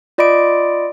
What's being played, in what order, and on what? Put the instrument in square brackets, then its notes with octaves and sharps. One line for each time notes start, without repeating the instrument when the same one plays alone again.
[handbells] F4 D5 D#5 B5 D6 D7